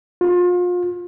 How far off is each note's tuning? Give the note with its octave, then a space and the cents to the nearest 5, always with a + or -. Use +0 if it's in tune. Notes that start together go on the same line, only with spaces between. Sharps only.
F4 +35